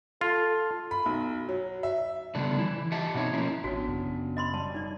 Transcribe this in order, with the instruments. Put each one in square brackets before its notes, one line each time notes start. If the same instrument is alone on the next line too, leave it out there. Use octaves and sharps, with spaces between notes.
[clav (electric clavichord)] F4 [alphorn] A4
[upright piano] B5
B1
F#3
E5
[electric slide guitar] C#3 G3 A3 B3 D4
E3 E4
G4 D#5 E5 F#5 A5
B2 C4 D#4 C#5
F3 A#3 C#4 E4
[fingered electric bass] A1 [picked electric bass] B3 D4 [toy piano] F#4 C#5
[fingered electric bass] F#2 C#3
[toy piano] D#5 B5 C6
[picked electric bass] E1 F#3 G3 [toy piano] A5
[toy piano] D#4 D5